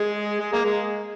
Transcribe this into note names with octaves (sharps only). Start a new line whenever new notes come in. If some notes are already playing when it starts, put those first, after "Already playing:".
Already playing: G#3
G#3
A#3
G#3